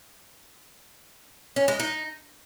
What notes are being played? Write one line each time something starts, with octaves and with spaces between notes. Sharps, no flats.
C#4
G#3
D#4